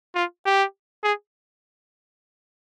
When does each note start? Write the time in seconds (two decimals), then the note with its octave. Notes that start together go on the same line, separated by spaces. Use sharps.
0.15 F4
0.45 G4
1.04 G#4